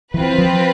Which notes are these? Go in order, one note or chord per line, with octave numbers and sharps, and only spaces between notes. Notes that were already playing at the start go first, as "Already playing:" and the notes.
E3 C4 F4 B4
F3